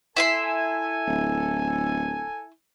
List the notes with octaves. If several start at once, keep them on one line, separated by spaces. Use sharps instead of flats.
E4 A4 E5 G#5 C6
D1